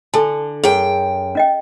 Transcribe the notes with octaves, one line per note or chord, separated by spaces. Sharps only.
D3 A4 G#5 A5
F#2 G#4 G5
C#4 D#5 G5